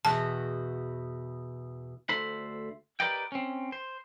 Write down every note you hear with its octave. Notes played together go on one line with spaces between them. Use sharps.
E2 B2 F#4 A5
D2 A4 C5 B5
G4 A#4 B4 D5 D#5 G5
C4 C#4
C5